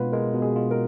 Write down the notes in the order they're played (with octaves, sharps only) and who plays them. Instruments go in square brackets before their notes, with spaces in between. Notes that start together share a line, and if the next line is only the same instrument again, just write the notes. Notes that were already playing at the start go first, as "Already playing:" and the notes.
Already playing: [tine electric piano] B2 G#3 B3 F4 [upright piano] B4
[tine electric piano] G#3 [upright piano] A#4
[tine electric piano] B2
[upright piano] G#4
[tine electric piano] F4
[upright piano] A#4